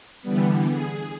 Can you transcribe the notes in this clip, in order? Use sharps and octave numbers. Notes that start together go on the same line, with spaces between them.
D3 E3 G3 B3
G#4